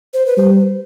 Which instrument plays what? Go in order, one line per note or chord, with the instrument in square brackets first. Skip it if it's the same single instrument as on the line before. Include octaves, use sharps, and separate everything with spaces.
[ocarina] C5
B4
[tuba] G3 [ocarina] C5